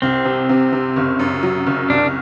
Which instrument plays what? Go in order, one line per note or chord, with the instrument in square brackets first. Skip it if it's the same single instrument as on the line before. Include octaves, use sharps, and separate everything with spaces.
[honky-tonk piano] C2 [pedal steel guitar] C4
[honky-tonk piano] C3
C3
C3
F#1
F#2
F#3
F#1
[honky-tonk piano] C2 [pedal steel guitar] D4